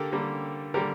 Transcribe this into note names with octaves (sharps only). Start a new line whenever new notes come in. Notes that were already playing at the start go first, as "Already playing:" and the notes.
Already playing: D3 A#3 G4 A4 A#4
D3 G3 A#3
D3 G3 A#3 G4 A#4